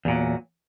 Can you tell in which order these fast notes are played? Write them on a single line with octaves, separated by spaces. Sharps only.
E2 A#2 F#3